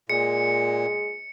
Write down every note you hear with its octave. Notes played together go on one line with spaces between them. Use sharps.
A#2 G#3 C#7